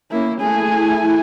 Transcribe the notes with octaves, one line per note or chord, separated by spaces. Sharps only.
A#3 C#4 E4
A3 E4 G#4 G#5